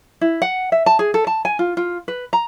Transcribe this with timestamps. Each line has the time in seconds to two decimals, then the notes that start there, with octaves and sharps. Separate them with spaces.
0.21 E4
0.42 F#5
0.72 E5
0.86 A5
0.99 G#4
1.14 A4
1.27 A5
1.45 G#5
1.59 F4
1.77 F4
2.08 B4
2.33 A#5